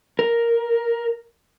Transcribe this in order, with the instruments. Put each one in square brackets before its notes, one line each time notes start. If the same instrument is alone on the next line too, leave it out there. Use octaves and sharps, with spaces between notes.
[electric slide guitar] A#4